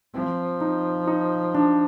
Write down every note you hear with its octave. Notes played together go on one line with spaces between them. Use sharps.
F3 C4
D#4
D#4
D4